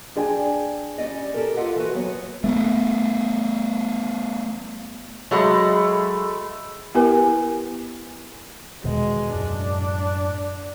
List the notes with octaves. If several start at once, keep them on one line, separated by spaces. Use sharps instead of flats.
D4 G#4 D5 G5 G#5
G3 C#4 D5 D#5
G4 A4 A#4
F4 A4 A#4 D#5 E5 F#5
E3 F#4 B4
F#3 B3 C#5
A3 B3
F#3 G#3 A3 B5
B3 E4 G4 A#4 B4 G#5
E2 B2 D#3 G#3
F#2 A2 D4